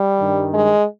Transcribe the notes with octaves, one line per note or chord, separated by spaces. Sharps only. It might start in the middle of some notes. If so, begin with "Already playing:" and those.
Already playing: G3
G2 D#3
G#3